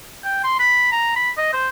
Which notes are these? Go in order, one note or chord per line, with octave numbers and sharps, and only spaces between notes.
G5
C6
B5
A#5
B5
D#5
C5